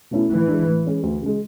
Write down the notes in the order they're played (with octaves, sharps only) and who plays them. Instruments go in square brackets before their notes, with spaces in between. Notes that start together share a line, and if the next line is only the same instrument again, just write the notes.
[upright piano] B2 A3 C#4 E4
[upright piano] A2 [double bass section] E3
[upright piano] G#3 D4
A2
G#3 C#4 G#4
D2
C#3 G#3